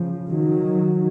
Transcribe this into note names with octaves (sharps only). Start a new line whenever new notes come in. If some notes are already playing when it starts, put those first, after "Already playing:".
Already playing: C#3 F3
D#3 F#3